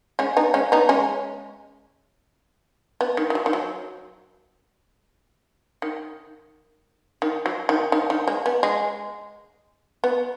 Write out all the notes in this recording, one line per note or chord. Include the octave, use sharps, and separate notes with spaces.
G#3 C#4
B3 D#4
G#3 C#4
B3 D#4
G#3 C#4
B3
D#3
D#3
F#3
D#3
F#3
D#3
D#3
F#3
D#3
D#3
D#3
G#3
B3
G#3
B3